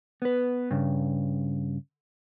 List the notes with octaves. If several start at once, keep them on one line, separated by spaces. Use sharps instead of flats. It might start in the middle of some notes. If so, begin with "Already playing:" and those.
B3 B4
G2 C#3